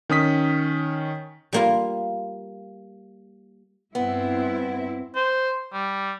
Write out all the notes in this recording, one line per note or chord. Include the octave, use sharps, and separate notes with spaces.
D#3 C#4 D#6 B6
G3 A#3 F4
G2 B3 C4 E4
C5
G3